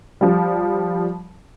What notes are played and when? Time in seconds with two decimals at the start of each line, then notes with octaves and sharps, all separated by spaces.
0.21 F3 G3